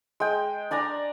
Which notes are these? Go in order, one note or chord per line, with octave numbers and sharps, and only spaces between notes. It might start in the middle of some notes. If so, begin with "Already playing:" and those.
G#3 G5
D4 D5 G#5 A#5